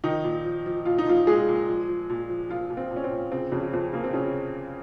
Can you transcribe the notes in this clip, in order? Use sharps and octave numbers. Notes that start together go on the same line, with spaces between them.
D#3 F3 D#4
A#2
F3
F3
A#2 F4
D#4
A#2 F3 F4
A#2 G#3 G#4
A#2
F3
F3
A#2
F3
A#2 F3 F4
A#2
C4
A#2
C#4
C4
A#2
C#3 C4
F2 C#3 C#4
F2 C4
C#3 A#3
C4
C#3 F3 C#4